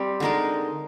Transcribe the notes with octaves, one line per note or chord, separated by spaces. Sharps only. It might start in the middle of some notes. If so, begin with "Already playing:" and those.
Already playing: G3 C4 G4
D3 G#3 D#4 A#4